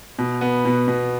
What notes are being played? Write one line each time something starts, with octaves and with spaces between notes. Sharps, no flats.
B2
B3
B2
B2